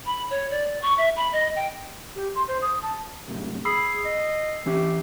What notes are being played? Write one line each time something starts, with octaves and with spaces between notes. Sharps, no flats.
B5
C#5
D5
C#6
E5
B5
D#5
G5
G4
C6
C5
D#6
A5
C2 F#2 A2
G#4 B5 E6 C7
D#5
E3 C#4 G4 E5